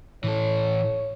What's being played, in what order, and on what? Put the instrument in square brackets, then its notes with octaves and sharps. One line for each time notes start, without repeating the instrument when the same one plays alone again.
[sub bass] A2 [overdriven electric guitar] E3 A4 [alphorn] C#5